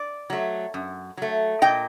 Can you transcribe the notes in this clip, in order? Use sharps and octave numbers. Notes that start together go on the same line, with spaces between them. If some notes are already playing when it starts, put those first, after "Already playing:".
Already playing: D5
F#3 A3
F#2
F#3 A3
A#2 D#5 G5